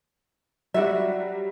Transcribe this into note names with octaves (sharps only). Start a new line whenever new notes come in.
F#3 G3 D4 F#4 E5